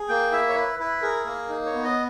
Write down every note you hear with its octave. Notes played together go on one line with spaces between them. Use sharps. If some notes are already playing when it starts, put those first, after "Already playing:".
Already playing: G#4
A#3 G5
E4 E5
C#5
E4 B4
E4 B4
G#4 A#4
A#3 A#4
D#4
C#5
B3
D#5